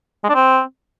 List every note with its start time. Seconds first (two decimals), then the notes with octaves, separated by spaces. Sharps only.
0.24 G#3
0.29 D4
0.35 C4